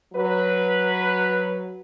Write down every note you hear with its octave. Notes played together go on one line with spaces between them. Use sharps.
F#3 B4